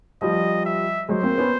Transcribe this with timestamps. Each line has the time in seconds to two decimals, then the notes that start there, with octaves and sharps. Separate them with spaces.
0.22 F3 G3 D#5
0.65 E5
1.09 F#3 G#3 C5
1.23 A#3 C4
1.38 B3 C#4